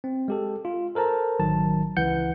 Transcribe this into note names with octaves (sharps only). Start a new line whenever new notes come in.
C4
G#3 G4 A4
F4
A4 A#4 C5 A5 A#5
A1 D#3 F#3 A5
C#2 C#3 E3 F#5 G6 C#7